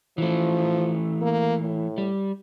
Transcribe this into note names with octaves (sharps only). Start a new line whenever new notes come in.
E3 F3 A3
A#3
A2
G3